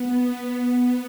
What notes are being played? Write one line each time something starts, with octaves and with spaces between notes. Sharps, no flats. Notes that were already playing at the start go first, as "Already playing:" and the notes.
Already playing: B3